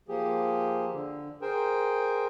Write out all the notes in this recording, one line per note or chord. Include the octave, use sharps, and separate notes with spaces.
F3 A#3 G4 G#4
D3
G#4 A#4 C5 G5